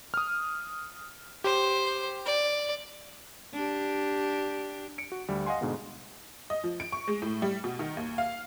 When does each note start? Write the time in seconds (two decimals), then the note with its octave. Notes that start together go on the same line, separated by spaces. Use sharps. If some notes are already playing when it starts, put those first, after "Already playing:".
0.14 D#6 F6
1.44 G4 C5
2.26 D5
3.54 D4 G4
4.98 C#7 D7
5.12 F#4
5.28 D2 G3
5.46 D#5 F5 F#5 G#5 C6
5.61 G#2 B2 D3 G#3 B3
6.50 D#5
6.64 F3
6.80 D7
6.92 C#6
7.08 G#3
7.22 A2
7.42 G3
7.64 B2
7.79 D#3
7.97 D#2
8.18 F5